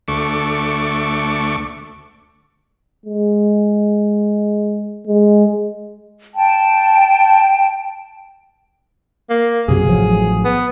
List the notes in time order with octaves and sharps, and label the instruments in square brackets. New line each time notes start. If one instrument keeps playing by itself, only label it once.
[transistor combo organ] D2 A3 C#6 D6
[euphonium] G#3
G#3
[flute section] G5 A5
[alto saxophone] A#3
[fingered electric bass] F#2 C3 F#3 [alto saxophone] G#4
[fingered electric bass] A1 F3 F#3
[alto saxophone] B3